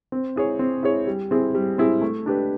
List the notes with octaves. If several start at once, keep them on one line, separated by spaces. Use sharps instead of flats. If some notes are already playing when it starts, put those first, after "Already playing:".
C4
E4 G#4 C#5
C4
E4 G#4 C#5
G3
C4 E4 G#4
G3
C4 E4 G#4
A3
D4 G4 B4